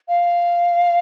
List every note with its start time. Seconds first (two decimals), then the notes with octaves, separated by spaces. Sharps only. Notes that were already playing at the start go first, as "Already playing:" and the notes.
0.09 F5